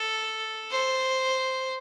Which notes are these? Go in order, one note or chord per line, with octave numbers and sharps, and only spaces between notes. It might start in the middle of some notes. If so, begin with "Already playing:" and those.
Already playing: A4
C5